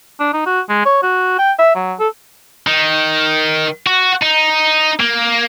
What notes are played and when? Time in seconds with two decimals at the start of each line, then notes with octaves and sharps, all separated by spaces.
0.20 D4
0.34 D#4
0.46 F#4
0.69 G#3
0.85 C#5
1.03 F#4
1.39 G5
1.59 E5
1.75 F#3
2.00 A4
2.67 D#3
3.86 F#4
4.22 D#4
5.00 A#3